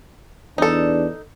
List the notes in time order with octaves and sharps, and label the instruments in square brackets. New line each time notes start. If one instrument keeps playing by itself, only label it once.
[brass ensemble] E2 D4 [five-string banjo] D#4 A4